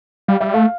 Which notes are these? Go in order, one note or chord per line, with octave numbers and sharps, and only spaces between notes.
G3 F5
G3 E5
A3 F5